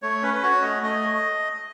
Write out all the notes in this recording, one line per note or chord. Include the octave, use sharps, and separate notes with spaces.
A3 C#5
C#4 B4
B4
F#4 C#5
A3 D#5
A3 D#5